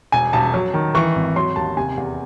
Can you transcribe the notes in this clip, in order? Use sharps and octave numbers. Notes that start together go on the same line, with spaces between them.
E1 G#5
E1 A5
F#3
D#3
E3 C#6
G#1
F#3 C6
D#2 A5
C3 G#5
E2